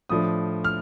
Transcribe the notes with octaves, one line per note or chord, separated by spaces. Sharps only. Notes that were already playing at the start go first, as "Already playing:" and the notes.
A2 F3 A3 D4 D#6
F6